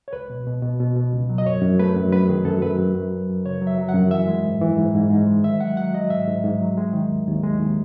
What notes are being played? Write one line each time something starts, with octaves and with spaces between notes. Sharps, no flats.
C#5
C#2 B4
B2
B2
B2
B2
B2
C#2
F#3
D#5
F#2 C#5
F#2
A3 B4
F#2
F#2 B4
D#3 G#4
F#2 A4
F#2 B4
F#2
F#2
F#3
F#2
C#3 C#5
F#3
E5
F#3
F#5
F#2
E3 E5
G#3
G#2
E3
G#2
G#2
G#2
G#3
D#3 E5
F#3 F#5
F#3 F#5
F#3 D#5
G#2 E5
G#2
G#2
F#3
G#3
D#3
D#2
D#2
G#3
D#2